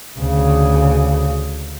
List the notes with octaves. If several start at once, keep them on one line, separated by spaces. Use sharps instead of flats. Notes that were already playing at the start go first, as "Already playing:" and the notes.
D2 C#3